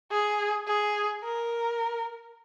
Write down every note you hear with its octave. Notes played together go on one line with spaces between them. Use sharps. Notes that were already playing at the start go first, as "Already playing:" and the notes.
G#4
G#4
A#4